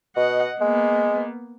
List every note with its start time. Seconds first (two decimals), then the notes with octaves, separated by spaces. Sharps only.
0.16 B2 D#5 F#5
0.61 G#3 A#3 B3